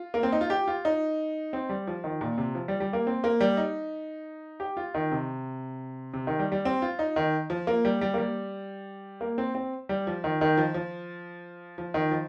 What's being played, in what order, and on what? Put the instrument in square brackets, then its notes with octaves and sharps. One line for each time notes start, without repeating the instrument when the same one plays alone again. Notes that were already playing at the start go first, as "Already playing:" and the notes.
Already playing: [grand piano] F4
A#3
C4
D#4
F4
G4
F4
D#4
C4
G3
F3
D#3
A#2
C3
F3
G3
G3
A#3
C4
A#3
G3
D#4
G4
F4
D#3
C3
C3
D#3
G3
G3
C4
F4
D#4
D#3
F3
A#3
G3
G3
A#3
G3
A#3
C4
C4
G3
F3
D#3
D#3
F3
F3
F3
D#3
F3